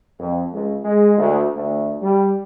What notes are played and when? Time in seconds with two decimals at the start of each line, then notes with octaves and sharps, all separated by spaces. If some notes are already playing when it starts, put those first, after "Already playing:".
0.18 F2
0.52 C#2
0.84 G#3
1.18 D2
1.55 D2
2.01 G3